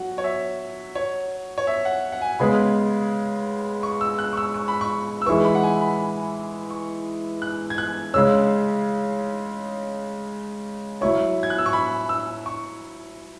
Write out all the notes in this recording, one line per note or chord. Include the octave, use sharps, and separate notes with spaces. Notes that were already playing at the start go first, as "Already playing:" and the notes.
Already playing: F#3 F#4 F#5
C#5
E5
C#5
C#5
E5
F#5
F#5
G#5
C#3 G#3 B3 G#4 B5
C#6
E6
F#6
C#6
E6
C#6
B5
C#6
E6
E3 G#3 E4 G#4 B4 C#6
B5
F#5
G#5
B5
C#6
F#6
G#6
F#6
C#3 G#3 C#4 E6
F#3 E4 C#5 C#6
G#6
F#6
E6
C#6
B5
E6
C#6